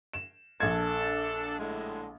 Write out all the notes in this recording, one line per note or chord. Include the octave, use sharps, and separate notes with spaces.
E7
A#1 D4 A4 G#6
A2 D3 G#3